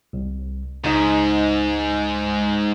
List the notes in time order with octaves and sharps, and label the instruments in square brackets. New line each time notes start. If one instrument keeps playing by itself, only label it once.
[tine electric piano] C2
[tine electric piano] C#2 D#4 D#5 [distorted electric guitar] G#2